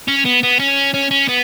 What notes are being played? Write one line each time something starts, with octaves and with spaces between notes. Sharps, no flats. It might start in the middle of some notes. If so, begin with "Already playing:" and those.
C#4
B3
B3
C#4
C#4
C#4
B3